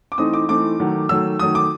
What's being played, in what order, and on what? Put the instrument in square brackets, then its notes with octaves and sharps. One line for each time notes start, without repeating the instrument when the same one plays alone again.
[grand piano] D6
E3 A3 C4 D#4 D#6
D6
E3 A3 C4 D#4 D6
D#3 F#3 A3
D#3 F#3 A3 E6
D#3 F#3 A3 D#6
D6